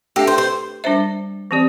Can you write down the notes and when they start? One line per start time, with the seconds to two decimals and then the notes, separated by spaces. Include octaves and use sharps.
0.16 A3 D4 G4 A4 E5
0.27 C5
0.38 C5
0.84 G3 D4 C5 E5
1.51 E3 C4 G4 D5